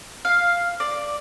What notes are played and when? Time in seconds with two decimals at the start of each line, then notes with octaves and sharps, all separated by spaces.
0.25 F5
0.80 D5